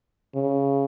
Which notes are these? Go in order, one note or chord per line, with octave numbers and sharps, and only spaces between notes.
C#3